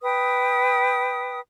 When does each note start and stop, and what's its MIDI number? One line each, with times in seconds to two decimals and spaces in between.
0.02 1.39 71
0.02 1.39 79
0.02 1.39 87